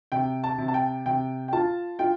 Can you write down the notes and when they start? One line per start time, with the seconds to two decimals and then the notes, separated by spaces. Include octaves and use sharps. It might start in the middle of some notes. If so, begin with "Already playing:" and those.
0.12 C3 G5
0.44 A5
0.58 C3
0.68 A5
0.74 G5
1.06 C3 G5
1.48 G5
1.53 F4 A5
1.99 F4 G5